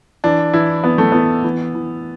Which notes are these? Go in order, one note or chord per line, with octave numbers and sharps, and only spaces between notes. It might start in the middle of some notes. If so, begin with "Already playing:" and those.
E3 D4
E3 E4
E3 B3
A3
E3 B3
E3
E3